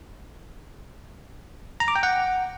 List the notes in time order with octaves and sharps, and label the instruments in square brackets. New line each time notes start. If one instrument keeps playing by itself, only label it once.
[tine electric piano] A#5
D6
G5
F#5